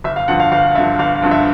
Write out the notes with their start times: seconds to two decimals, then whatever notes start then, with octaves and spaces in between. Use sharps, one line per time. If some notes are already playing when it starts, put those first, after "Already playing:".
0.04 G1 E5
0.16 F5
0.28 G2 D3 F3 F#5
0.40 F5
0.52 G1 F5
0.75 G2 D3 F3 E5
0.99 G1 F5
1.15 F5
1.22 G2 D3 F3
1.31 E5